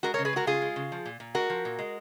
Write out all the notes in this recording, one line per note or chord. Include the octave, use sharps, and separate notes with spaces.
G#3 F#4 A#4
A#4 C#5
C#3
G#4 B4
G#3 F#4 A#4
C#3 F4 G#4
G#3
C#3
F3
A#2
A#2
G#3 F#4 A#4
F3
A#2
G#3